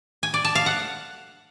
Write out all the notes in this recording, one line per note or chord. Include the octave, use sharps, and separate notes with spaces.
G#5
D5
A5
F5
F#5